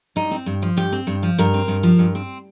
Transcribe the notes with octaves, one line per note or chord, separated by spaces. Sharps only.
G2 D#4
C4
G2
F3
G2 G4
C4
G2
F3
G2 A#4
C4
G2
F3
G2
C4